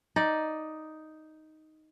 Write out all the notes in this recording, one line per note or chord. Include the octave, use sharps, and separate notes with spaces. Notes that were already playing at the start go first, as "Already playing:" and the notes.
D#4 D5